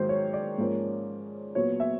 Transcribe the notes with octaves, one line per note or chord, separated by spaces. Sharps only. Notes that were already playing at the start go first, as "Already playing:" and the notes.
Already playing: G#2 D#3 F#3 A#3 C5
C#5
D5
G#2 F3 A#3 C#4
A#2 F#3 B3 C#5
E5